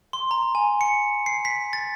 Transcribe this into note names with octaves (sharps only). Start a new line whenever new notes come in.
C6
A#5
G#5
C#7
C7
B6
A6